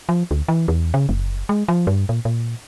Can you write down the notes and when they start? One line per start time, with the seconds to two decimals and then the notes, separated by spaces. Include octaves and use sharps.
0.09 F3
0.31 D2
0.48 E3
0.68 E2
0.94 C#3
1.09 F#1
1.49 G#3
1.68 F3
1.87 G2
2.09 A#2
2.25 A#2